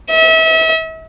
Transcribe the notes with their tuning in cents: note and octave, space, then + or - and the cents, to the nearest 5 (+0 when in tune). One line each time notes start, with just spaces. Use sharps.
E5 -35